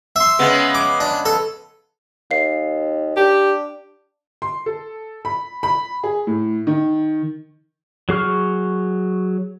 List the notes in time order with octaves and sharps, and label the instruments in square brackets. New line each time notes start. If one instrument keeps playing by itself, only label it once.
[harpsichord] E5 C6
[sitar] C#3 G#3 B3
[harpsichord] D6
D4
A4
[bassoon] D#2 [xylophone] F5 C7
[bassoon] D4 [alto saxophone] G4
[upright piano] C6
A4
B5
B5
G#4
A2
D#3
[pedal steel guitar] F#3 G#4 C#6 F6